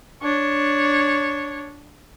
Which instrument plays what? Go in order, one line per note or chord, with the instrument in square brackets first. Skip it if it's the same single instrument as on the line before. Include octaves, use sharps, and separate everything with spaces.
[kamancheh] D4 C#5